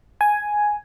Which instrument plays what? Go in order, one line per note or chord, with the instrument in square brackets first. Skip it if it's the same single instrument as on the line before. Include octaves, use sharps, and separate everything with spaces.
[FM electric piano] G#5